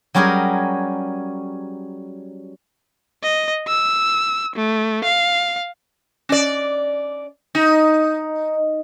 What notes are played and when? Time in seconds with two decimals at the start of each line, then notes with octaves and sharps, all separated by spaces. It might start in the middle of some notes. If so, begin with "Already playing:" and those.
0.15 F#3 G3 C#4 G4 G#4 A#4
3.23 D#5
3.67 E6
4.56 A3
5.04 F5
6.29 C#4 D5
7.55 D#4